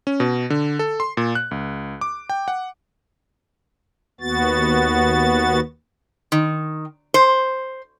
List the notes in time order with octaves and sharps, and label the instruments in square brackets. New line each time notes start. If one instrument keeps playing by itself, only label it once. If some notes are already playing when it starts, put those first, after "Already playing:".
[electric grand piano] C#4
B2
D3
A4
C6
A#2
F#6
C#2
D6
G5
F#5
[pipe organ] D#2 B3 F#4 A6
[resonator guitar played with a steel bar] D#3
C5